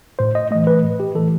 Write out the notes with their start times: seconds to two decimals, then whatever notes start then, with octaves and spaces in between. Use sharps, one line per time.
0.19 A2 C5
0.35 D#5
0.51 E3 A3 D#5
0.67 B4
0.83 A2
1.00 G4
1.15 E3 A3 A4